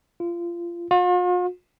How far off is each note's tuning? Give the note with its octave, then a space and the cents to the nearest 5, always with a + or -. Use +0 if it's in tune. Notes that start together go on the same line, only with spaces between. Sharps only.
F4 -25
F4 +45